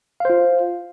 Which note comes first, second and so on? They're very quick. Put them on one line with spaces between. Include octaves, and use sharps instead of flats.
F5 C5 F4